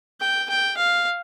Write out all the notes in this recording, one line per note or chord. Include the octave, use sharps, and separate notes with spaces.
G5
G5
F5